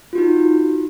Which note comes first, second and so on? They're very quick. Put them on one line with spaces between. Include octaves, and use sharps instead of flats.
F4 F#4 D#4